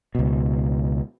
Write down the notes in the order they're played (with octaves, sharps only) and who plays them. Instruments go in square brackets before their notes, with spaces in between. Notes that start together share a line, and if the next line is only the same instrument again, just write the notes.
[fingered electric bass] C#2 B2